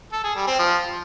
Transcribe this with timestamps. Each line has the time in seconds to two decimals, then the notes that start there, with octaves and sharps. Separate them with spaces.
0.12 A4
0.24 G#4
0.36 G3
0.47 C4
0.59 F3